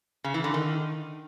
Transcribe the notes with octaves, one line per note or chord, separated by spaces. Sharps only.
C#3
E3
D3
D#3